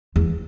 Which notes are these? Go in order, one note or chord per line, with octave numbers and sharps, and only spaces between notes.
E2 E3